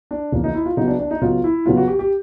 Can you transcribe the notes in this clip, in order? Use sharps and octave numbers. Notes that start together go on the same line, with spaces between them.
D4
E2 C#3 F3 A#3
D#4
E4
F4
C#3 F#3 B3 D#4
D4
D4
D#4
C#3 F#3 B3 F4
E4
C#3 F#3 B3 F4
F#4
G4
G4